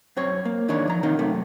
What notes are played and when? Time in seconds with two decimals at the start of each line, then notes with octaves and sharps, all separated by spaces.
0.17 F#2 C4 C#5
0.45 A#3
0.68 E2 D#3 D4 E4 C#5
0.88 F3 A#5
1.03 C3 D#3 A#3 D#4
1.19 F#2 C3 A3